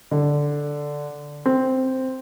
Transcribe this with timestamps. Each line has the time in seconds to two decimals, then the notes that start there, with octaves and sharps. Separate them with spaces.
0.11 D3
1.46 C4